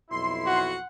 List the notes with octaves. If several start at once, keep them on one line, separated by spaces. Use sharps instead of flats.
B1 F2 E4 C6
F#4 F#5